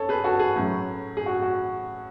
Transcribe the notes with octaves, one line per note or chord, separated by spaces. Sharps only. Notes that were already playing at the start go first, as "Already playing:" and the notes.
Already playing: F#2 A4 C#5
G#4 B4
F#4 A4
G#4
A2 F#3 C#4
G#4
F#4
F#4